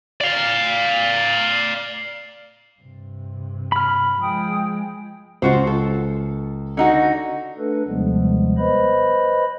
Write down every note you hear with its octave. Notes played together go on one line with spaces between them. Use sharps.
D5 F5
G2 C3
B5 F6
F3 G#3 G5 D#6
C#2 F4 F#4 C5 C#6
A4
D3 D#4 F#4
A3 D4 A4 B4
D#2 C3 F3 G3 G#3 B3
B4 C5 D#5 B5